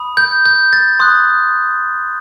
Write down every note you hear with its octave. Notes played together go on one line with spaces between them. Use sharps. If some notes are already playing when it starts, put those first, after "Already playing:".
Already playing: B5 D#6
G6
G6
A6
C6 D#6 F#6